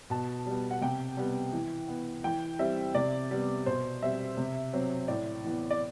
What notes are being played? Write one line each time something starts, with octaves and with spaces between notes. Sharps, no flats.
B2 A5
G3 B3
F#5
C3 G5
G3 B3
E3
B3
E3 G5
G3 C4 E5
C3 D5
G3 B3
B2 C5
G3 C4 E5
C3
F#3 C4
A2 D5
E3 B3
D5